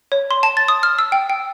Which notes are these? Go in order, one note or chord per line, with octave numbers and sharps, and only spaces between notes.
C#5
C6
A5
A6
D#6
F6
E6
G5
G5